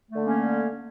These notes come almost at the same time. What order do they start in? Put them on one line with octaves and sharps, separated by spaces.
A3 D3 A#3 C#4